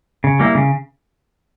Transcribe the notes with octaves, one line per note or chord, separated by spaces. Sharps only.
C#3
G3 A#3 E4
C#3